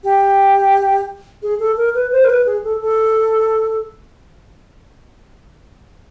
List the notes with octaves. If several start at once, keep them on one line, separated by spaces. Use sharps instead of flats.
G4
G#4
A4
A#4
B4
C5
A#4
B4
G#4
A4
A4